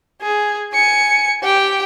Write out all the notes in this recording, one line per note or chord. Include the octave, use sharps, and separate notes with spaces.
G#4
G#5 C#7
G4 G5